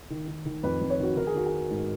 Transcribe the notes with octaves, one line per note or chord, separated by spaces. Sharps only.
D#3
D#3
D#3
F2 B4
F2
C#5
D#3 F#4
D#3 A#4
G#4
D#3 F#4
G#4
D#3
G#2